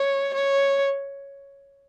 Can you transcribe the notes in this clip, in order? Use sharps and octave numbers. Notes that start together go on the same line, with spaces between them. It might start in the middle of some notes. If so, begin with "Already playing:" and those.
Already playing: C#5
C#5